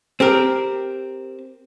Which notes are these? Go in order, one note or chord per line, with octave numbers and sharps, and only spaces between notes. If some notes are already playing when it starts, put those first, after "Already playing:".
C4 G4 A#4